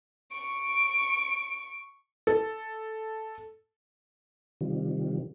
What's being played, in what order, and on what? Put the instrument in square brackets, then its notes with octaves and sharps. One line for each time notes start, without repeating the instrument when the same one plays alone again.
[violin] C#6 D7
[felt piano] A4
[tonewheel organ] C3 D#3 F3 G3